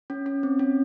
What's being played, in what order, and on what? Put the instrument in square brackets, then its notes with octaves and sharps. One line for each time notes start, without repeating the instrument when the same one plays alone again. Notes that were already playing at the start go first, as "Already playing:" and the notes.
[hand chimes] C#4
C#4
C4
C#4